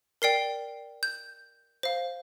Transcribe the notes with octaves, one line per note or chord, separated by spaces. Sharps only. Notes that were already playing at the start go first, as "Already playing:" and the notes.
A#4 D5 G5 C7
G6
C5 F5